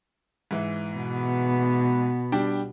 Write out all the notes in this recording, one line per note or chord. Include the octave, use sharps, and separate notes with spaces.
G#2 E3
B2 B3
G3 D4 G5